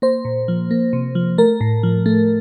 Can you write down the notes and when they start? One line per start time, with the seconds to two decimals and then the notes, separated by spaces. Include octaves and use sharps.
0.02 A#3 C5
0.25 A#2
0.48 F3
0.71 A#3
0.93 C3
1.15 F3
1.38 A3 A#4
1.61 A2
1.83 F3
2.06 A3